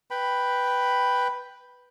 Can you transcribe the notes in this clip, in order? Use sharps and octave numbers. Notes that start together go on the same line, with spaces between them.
B4 G5 B5